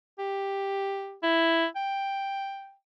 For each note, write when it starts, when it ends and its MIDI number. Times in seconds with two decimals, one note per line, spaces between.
0.19 1.17 67
1.23 1.66 64
1.76 2.74 79